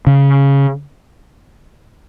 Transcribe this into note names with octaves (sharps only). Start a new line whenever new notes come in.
C#3